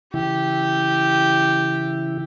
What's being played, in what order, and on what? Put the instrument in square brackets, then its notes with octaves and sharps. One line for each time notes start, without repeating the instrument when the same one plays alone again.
[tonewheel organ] C#3 E3 E4 [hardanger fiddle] G4